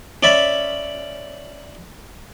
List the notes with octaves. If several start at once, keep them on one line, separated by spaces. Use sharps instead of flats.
C#4 D5 E5 B5